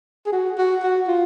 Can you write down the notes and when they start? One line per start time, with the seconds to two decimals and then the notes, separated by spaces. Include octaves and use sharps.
0.26 G#4
0.32 F#4
0.58 F#4
0.83 F#4
1.08 F4